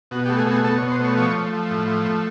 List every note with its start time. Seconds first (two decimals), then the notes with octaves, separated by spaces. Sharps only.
0.11 B2 F#4
0.26 G4
0.29 A3
0.38 G#4
0.47 B2
0.52 G#4
0.64 B2 A4
0.78 C#5
0.83 B2
0.92 C5
0.99 A3 C#5
1.17 F3 C#5
1.35 A3
1.53 F3
1.71 A2
1.87 F3
2.06 A3